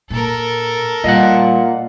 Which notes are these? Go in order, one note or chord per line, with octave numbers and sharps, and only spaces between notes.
A#2 A4 A#4
A#2 G3 D#5 F5 F#5